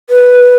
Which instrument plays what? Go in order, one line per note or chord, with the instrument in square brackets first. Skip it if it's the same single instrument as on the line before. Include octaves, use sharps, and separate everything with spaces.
[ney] B4